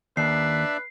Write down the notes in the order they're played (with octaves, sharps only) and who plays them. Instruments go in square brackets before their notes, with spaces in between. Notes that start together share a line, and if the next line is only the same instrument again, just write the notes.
[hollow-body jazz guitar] D#2 [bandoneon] D4 D5 E5 [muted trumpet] B4 [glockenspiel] C7